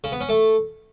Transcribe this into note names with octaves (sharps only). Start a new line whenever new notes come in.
C#3
B3
C#4
A3